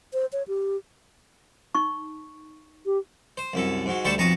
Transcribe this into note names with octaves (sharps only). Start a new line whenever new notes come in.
C5
C#5
G4
D#4 C#6
G4
C5
C2 F#2 A4
G#2 F#3
D2 G3 A4 C5 A5 C#6
B1 F2 A5 A#5 C#6 D#6